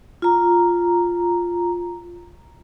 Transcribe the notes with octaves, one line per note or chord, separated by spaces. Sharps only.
F4 A#5